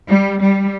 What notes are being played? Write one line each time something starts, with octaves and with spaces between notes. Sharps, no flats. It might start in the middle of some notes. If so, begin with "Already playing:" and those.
G3
G3